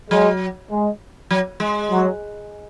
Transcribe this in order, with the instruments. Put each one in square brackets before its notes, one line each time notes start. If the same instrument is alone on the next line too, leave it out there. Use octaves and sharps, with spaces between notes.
[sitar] F#3 [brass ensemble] G#3
[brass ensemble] G#3
[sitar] F#3
G#3
[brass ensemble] F#3